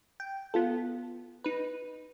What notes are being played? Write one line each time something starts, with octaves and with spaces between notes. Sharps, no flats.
G5
B3 F4 A4
D#4 B4